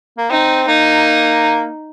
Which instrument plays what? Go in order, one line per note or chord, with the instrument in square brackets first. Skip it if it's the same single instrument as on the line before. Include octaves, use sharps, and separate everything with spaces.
[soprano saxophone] A#3
[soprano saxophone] C4 [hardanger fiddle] D#4
[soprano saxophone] A#3 [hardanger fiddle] D#4